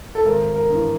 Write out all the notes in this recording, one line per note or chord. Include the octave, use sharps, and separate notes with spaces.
A4
G#1 A#4
A#4
G2 E3